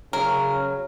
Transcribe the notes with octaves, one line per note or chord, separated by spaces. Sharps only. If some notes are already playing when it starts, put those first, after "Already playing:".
C#3 F#3 C#4 A#4